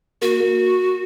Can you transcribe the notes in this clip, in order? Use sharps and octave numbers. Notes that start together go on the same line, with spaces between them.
A#3 F#4
A#3